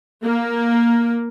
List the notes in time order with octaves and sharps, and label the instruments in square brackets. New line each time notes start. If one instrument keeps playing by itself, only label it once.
[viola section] A#3